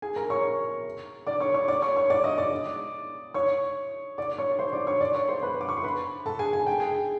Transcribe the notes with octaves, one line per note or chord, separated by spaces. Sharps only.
G#4 G#5
A#4 A#5
C#5 C#6
D5 D6
C#5 C#6
C#5 C#6
D5 D6
C#5 C#6
C#5 C#6
D5 D6
D#5 D#6
D5 D6
C#5 C#6
D5 D6
C#5 C#6
C5 C6
D5 D6
C#5 C#6
D5 D6
C#5 C#6
C5 C6
B4 B5
D6
C#6
C6
B4 B5
A4 A5
G#4 G#5
G#5
G5
G#4 G#5